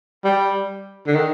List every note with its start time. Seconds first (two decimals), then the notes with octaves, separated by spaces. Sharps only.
0.24 G3
1.07 D3
1.15 D#3